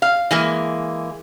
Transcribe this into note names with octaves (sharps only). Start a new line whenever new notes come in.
F5
E3 G#3 A#3